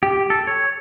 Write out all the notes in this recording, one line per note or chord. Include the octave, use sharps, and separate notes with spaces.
G4
A4
C#5